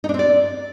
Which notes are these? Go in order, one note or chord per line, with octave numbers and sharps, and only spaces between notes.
D#4
D4
C4
D5